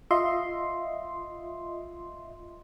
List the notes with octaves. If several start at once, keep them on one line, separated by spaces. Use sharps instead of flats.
F4 D#5 E5 C6